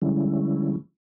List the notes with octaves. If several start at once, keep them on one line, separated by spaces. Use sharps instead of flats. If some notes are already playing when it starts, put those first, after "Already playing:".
D3 F3 G3 G#3 C#4 E4